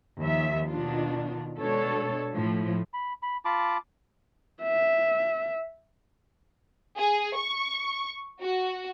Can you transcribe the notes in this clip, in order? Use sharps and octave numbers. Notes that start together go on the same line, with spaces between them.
D#2 F3 E5
B2 D#3 D4 F4
B2 G#3 D4 A4 C#5
A2 F3
B5
B5
F4 A5 B5 D6
E5
G#4
C#6
F#4